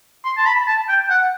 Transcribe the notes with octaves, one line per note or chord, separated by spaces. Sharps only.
C6
A5
B5
A5
G5
F#5